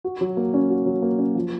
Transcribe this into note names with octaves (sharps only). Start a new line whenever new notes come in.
F#4
F#3
A#3
C#4
F#4
F#3
A#3
C#4
F3